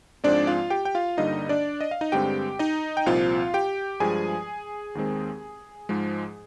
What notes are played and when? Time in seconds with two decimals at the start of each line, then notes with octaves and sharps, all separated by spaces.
0.24 G#2 F3 G#3 C4 D4 D5
0.47 F4 F5
0.70 G4 G5
0.85 G5
0.95 F4 F5
1.18 G2 D3 G3 A#3 D#4 D#5
1.49 D4 D5
1.81 D#5
1.91 F5
2.01 D#4 D#5
2.12 G2 D3 G#3 C4 G4 G5
2.59 D#4 D#5
2.97 G5
3.06 C2 A#2 F3 C4 F4 F5
3.54 G4 G5
4.00 G2 F3 G#3 G#4 G#5
4.95 D#2 D#3 G#3 C4
5.89 G#2 F3 G#3